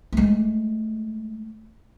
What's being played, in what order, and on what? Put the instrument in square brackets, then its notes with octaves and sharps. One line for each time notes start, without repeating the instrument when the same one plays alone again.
[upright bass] G#3 A3